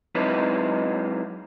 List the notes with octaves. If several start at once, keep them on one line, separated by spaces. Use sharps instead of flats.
F#3 G#3 C4 D#4 E4 B4